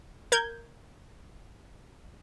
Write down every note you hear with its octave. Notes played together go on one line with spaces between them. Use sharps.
A#4 G6 G#6